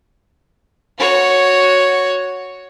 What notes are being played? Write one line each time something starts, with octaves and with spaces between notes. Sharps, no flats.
F#4 C#5